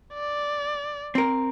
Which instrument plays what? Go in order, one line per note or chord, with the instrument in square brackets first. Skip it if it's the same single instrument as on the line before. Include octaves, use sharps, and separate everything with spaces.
[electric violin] D5
[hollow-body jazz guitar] C4 A#4